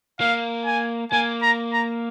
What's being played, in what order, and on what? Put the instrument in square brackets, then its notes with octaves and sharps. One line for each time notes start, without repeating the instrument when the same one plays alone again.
[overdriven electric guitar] A#3 [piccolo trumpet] F5
[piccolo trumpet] G#5
[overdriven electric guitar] A#3 [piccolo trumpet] G#5
[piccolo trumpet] A#5
A#5